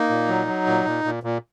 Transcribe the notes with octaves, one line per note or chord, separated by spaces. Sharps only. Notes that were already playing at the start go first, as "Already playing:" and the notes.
Already playing: A#3 D#4
A#2
F#3
F#3
A#2
A#2
A#2
A#2